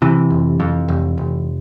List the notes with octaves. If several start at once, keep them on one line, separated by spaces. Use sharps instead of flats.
C3 E3
F1
F2
F1
F1